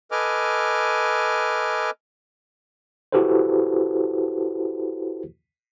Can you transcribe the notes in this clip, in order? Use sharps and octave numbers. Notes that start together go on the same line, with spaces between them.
A4 B4 D#5 G#5 D6 F6
E4 F#4 G4 A4 B4 C5